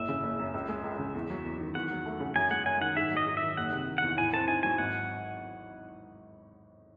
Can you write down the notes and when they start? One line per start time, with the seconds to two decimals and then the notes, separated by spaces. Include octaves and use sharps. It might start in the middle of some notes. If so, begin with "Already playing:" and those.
Already playing: F#1 A2 E5
0.09 C#3
0.23 F#1
0.39 F#2
0.54 C#2
0.68 G#3
0.84 C#2
0.99 C#3
1.15 E2
1.30 F#3
1.45 E2
1.60 D#3
1.75 E2 F#5
1.91 F#3
2.06 A3
2.20 C#3
2.35 F#2 G#5
2.50 G#3 F#5
2.66 F#2 G#5
2.81 D#3 F#5
2.97 G#2 E5
3.11 F#3
3.17 D#5
3.26 G#2
3.37 E5
3.42 D#3
3.57 F#1 F#5
3.72 C3
3.88 D#3
3.98 E2 F#5
4.17 A2 G#5
4.33 C4 A5
4.48 D#4 G#5
4.63 F#3 G#5
4.78 G#1 F#5